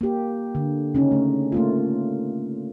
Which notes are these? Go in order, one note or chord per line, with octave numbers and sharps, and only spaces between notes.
A#3 G4
D3
C#3 C#4 D#4
A3
A3 A#3 F4